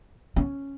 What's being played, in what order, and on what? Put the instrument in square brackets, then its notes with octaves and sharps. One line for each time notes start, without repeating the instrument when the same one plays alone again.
[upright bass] C#4